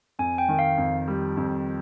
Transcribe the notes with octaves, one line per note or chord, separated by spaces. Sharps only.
F2 G#5
G5
D#3
F5
F2
G3
F2